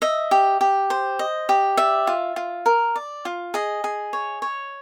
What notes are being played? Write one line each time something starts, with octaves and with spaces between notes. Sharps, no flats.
D#5 E5
G4
G4
C5
D#5
G4
D5 E5
F4
F4
A#4
D5
F4
G#4 D#5
G#4
C#5
C#5